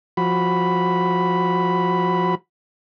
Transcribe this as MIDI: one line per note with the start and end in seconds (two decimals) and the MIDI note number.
0.17 2.35 53
0.17 2.35 66
0.17 2.35 83